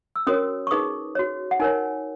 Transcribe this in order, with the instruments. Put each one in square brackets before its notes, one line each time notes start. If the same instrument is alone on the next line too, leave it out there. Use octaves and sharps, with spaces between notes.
[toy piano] E6
C#4 F#4 A#4 C#5 D#6
C#6
D#4 G#4 B4 D#6
F#4 C#5
F#5
D#4 A#4 C#5 G#5